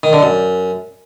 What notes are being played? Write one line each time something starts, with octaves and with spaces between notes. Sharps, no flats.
D#3
D3
F#2